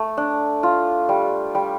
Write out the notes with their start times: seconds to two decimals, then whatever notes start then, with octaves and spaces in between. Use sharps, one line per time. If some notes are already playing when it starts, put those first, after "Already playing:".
Already playing: A3
0.17 D4
0.63 F4
1.09 G3
1.55 G3